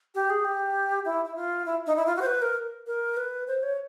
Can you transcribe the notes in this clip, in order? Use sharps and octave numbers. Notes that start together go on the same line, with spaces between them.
G4
G#4
G4
E4
E4
F4
E4
D#4
E4
F4
F#4
C5
B4
A#4
A#4
B4
C5
C#5